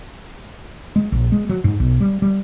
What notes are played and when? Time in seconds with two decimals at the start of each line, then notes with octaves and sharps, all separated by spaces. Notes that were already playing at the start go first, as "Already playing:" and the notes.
0.96 G#3
1.12 A#1
1.32 G#3
1.49 F#3
1.64 G#2
1.80 B1
2.01 G3
2.22 G3